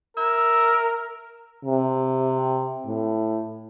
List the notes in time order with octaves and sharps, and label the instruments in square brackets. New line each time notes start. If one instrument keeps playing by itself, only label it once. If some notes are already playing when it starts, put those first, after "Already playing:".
[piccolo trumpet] A#4 [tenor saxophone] E5
[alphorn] C3
A2